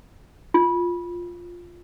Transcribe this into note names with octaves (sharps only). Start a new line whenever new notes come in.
F4